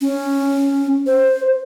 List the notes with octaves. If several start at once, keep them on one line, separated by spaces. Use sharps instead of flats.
C#4
C5